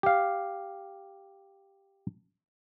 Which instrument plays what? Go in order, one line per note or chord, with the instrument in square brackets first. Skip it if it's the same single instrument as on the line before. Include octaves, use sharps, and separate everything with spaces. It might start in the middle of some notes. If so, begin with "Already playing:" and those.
[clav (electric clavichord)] G4 F5